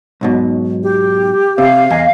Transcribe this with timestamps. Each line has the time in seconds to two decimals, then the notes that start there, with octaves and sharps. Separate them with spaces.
0.21 B1 G#2 B2
0.83 G4
1.58 C3 F5
1.90 E2 D#5 G#5